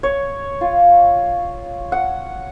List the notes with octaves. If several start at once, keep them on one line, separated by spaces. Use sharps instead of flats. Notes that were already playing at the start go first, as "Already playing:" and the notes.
C#5
F4
F#5